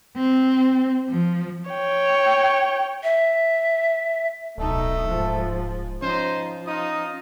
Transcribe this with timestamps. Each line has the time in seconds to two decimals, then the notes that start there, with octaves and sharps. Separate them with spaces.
0.17 C4
1.10 F3
1.71 C#5 G5
3.04 E5
4.58 D1 B1 A3 D#4 A4
5.08 G#2 F3
6.02 F3 C#4 D#4 C5
6.67 D#4 F4 D#6